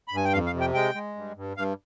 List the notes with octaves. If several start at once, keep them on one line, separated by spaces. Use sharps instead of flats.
B5
G2 G#5
G5
F2 F5
F5
C3
G5
G#3 G5
G#3
G2
G2
G2 F5